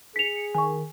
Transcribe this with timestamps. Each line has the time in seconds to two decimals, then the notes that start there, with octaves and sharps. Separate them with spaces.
0.16 G#4 B6 C#7 F7
0.55 D#3 G#5 C#6